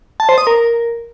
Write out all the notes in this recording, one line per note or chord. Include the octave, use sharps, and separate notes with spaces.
A5
C5
D#6
A#4